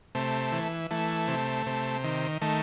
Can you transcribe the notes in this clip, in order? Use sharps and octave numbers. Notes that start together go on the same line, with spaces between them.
C3 A3
E3
E3 A3
C3
C3
D#3
D#3 A3